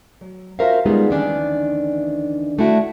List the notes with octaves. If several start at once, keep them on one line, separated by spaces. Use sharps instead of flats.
F#3
F4 F#4 A#4 C5 E5 F5
G3 G#3 B3 D#4 F4 G#4
D2 D#3 E3 C#4 D4 D5
G3 A3 D4 E4 F#4